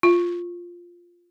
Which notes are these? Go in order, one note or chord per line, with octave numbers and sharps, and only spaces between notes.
F4